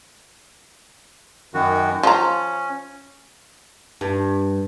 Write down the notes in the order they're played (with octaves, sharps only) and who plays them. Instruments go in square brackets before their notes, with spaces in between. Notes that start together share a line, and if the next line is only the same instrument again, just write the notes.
[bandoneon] F#2 D#3 F#4
[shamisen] F3 A#5 [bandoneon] C#4
[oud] G2